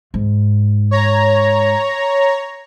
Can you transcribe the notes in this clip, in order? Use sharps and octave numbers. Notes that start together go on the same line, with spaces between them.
G#2
C#5 A#5